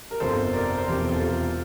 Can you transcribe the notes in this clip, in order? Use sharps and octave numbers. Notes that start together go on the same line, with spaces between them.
A#4
G1 F2 C3 F3 A#3 A4 C5
A#4 D5
C5
E1 E2 C3 F3 G4 A#4
G4
F4 A4